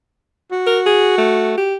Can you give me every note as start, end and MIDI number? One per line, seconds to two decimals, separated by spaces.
0.51 1.69 66
0.67 0.80 70
0.86 1.15 68
1.18 1.56 57
1.57 1.75 67